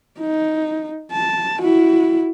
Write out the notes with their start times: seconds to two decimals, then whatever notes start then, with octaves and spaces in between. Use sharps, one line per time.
0.19 D#4
1.12 A5
1.62 E4 F#4